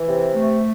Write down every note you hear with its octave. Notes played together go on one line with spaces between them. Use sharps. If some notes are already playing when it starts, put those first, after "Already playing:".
Already playing: E3
C3
A3